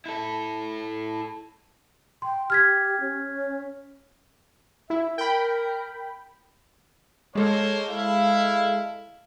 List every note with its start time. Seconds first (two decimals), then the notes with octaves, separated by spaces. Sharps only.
0.06 E4 A4
2.22 G5 C6
2.50 G4 F6 G#6 B6
3.01 C#4
4.90 E4 E5
5.18 A#4 G5 B5
7.35 G#3 A#3 A4 C5 C#5
7.89 E4 F5